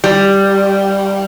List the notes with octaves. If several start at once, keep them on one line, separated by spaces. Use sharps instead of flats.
G3